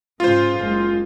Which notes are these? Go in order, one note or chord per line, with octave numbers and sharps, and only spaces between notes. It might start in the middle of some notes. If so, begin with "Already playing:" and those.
G#2 C#3 F4 C5
F#1 G#3